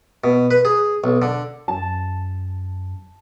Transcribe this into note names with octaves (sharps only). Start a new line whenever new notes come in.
B2
B4
G#4
B1
D3
F#2 A5